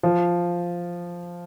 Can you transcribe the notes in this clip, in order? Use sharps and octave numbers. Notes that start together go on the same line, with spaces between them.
F3